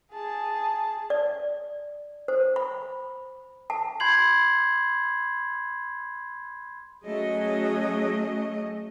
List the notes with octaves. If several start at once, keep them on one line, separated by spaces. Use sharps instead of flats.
G#4 A5
D5
C5
B5
A5
B5 C6 G6 G#6 C7 F#7
F#3 A3 C#4 G#4 D#5